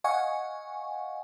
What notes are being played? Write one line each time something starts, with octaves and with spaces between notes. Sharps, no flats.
D#5 F5 F#5 G#5 C#6